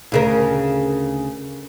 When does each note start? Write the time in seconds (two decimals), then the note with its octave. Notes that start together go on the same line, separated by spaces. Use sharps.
0.12 D2 C#3 A#4